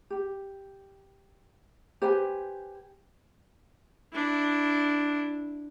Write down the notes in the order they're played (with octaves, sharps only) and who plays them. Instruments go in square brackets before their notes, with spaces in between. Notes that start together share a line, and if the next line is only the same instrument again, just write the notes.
[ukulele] G4
G4 B4 C5 G#5
[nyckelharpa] D4 E4